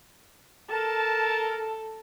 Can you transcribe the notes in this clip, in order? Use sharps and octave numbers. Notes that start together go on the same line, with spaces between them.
A4 A#4 A5